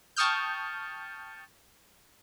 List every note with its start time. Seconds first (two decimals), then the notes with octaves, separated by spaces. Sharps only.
0.16 G5 A5 C#6 D#6 F6 G6